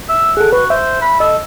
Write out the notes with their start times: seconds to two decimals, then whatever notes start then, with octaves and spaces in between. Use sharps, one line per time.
0.09 E5
0.37 G#4 A4 F#5
0.52 F#4 B4
0.70 C5 E5
1.01 B5
1.20 A4 D#5